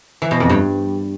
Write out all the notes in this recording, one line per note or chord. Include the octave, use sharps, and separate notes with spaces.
E3
B2
F2
G2